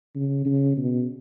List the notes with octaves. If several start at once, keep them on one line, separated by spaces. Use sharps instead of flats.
C#3
C#3
B2